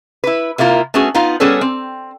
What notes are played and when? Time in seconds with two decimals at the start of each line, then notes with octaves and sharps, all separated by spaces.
0.24 E4 B4
0.58 C3 A#3 E4 F4 A#4
0.94 A3 B3 C#4 F#4 G#4
1.15 B3 D#4 F4 F5
1.40 G3 B3 C#4 G#4 A4 B4
1.61 C4